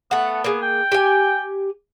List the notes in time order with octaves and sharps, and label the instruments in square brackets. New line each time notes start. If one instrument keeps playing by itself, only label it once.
[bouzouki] A3 F#5 [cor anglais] B3
[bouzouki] A#3 G#4
[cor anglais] G5
[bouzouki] G4 G#5